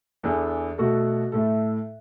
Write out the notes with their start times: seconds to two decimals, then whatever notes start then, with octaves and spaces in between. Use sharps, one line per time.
0.23 E2 E3 B3 D4 A4
0.78 B2 A3 F#4 A4
1.32 A2 A3 E4 A4